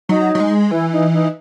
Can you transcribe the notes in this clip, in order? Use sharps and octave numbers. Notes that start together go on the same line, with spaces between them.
F#3 D#4
F#3
G#3
E3 E4
D#4
D#4